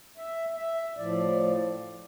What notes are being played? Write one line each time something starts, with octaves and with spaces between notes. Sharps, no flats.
E5
E5
A2 F3 D5